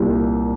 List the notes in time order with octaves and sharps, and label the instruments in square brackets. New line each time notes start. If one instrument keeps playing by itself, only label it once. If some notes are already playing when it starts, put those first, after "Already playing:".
Already playing: [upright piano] C2 A#2 G3